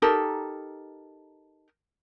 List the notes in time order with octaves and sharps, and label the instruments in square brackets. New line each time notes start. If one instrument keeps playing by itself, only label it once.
[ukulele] D#4 G4 A4 A#4